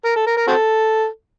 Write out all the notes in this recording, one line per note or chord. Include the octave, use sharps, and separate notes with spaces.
A#4
A4
A#4
A#4
C4 F#4 A4